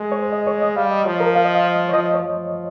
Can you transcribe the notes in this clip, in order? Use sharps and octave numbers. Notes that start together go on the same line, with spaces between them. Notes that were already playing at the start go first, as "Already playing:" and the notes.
Already playing: G#3
C#5
C5
D#5
C#5
D#5
G3 F5
D#5
F3 C#5
A#4
F5
D#5
F5
D#5
C#5
F3 D#5
D#5
C#5
F3